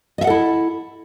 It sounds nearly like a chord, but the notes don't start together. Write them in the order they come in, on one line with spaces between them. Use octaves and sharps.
D#5 E5 F#5 A4 E4